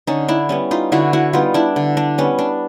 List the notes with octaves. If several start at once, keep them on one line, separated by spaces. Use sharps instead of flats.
D3 C#4 D#4
D4 E4
G3 B3 C#4
D#4 F4
D3 E4 F#4
E4 F#4
G3 B3 D#4 F4
D4 E4
D3
D4
G3 B3 C#4
D4